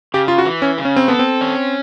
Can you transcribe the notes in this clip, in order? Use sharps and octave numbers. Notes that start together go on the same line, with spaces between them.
C#3 G4
F4
F#4
E3
C#4
C#3
C#4
C4
B3 A4
C4
C#4